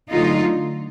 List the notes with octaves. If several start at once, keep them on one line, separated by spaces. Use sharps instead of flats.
D3 F#3 A3 D#4 F4